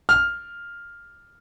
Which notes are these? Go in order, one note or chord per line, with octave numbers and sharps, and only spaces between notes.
F6